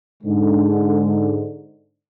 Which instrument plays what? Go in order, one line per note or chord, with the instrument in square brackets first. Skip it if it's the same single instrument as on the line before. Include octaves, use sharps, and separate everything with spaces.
[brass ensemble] G#2 D3